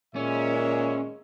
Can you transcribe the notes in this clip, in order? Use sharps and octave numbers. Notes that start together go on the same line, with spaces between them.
A#2 D#3 G#3 A#3 C#4 C#5 E5